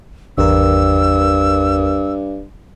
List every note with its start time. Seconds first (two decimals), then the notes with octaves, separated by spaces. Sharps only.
0.38 G#1 E2 G2 A#4 E6